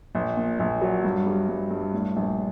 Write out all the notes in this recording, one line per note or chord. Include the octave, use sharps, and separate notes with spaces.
A#1
A#2
A#1
F#3
G2
G3
G2
G2
A2
A#1